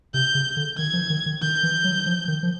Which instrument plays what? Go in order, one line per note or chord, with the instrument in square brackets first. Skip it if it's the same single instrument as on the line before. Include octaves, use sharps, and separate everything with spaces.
[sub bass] C3 [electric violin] G6
[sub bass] C#3
D3
[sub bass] D#3 [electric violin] G#6
[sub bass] F3
D#3
D#3
[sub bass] D#3 [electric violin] G6
[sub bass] E3
F#3
F3
D#3
F3